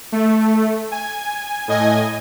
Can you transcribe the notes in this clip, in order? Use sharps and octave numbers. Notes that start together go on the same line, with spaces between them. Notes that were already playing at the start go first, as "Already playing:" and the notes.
A3
G#5
A2 D#5 G#5